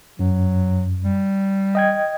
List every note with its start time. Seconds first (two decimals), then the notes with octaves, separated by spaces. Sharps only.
0.19 F#2 F#3
1.04 G3
1.75 D#5 G5 G#6